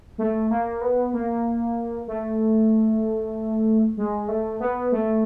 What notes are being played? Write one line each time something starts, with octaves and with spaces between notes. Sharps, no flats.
A3
A#3
B3
A#3
A3
G#3
A3
B3
A3